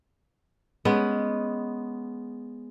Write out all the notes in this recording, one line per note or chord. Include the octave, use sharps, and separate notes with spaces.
G#3 B3 C#4